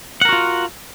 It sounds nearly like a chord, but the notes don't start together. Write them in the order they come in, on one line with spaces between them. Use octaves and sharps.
F#5 A#4 F#4 F4